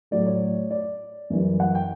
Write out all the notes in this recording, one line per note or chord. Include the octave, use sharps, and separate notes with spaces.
A2 F#3 A3 D5
C#5
D5
F#2 E3 G3
F#5
G5